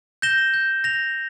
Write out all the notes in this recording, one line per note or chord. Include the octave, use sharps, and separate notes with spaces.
G6 A#6 E7 G7
G6
A#6 F7